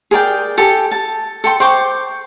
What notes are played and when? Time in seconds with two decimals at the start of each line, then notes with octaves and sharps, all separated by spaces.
0.11 G#4 A#4 D5 G5
0.57 G4 A4 G#5
0.92 A5
1.44 A4 G5 C6
1.60 C5 G5 C#6 D6